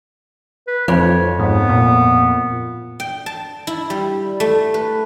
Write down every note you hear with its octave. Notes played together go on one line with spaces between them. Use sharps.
B4
F2 F3 C#5
G#2 B3
A#2
G5
A5
E4
G3
A3
B4